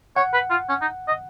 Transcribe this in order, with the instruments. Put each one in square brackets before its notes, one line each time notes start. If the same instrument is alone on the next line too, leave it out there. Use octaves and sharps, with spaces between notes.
[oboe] C#5 [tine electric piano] F#5
[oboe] B4
F4
C#4
D#4
D#5